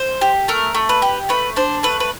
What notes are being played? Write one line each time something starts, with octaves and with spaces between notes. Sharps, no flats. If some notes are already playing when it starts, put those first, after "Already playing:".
Already playing: C5
G4
A3 A#4
A3
B4
G4
A3 B4
D4 C5
A3 B4
B4